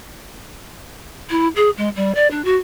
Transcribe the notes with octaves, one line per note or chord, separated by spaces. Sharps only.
E4
G#4
G#3
G3
D5
D4
F#4